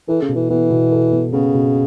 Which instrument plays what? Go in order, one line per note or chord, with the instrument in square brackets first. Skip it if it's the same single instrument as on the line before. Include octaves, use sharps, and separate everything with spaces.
[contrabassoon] E3 [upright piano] A4
[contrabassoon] C#3
[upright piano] B2
[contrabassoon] E3
[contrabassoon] E3 [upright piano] B3
[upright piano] B2
A4
B2
[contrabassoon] C#3 [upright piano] B3
[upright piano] B2